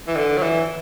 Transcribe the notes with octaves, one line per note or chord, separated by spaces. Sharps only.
E3
D3
F#3
E3